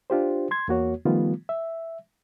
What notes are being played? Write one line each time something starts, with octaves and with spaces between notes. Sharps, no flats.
D4 F4 G4 C5
C6 G#6
E2 A#3 F#4 C#5
D#3 F3 G3 A3 B3 F4
E5